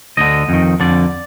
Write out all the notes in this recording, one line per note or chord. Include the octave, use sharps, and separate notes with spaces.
D2 D3 D#5
F2 D#3
F2 D3 D5